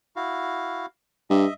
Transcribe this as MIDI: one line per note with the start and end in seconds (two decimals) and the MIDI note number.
0.16 0.86 64
0.16 0.86 66
0.16 0.86 77
1.30 1.46 43
1.30 1.54 75
1.30 1.54 76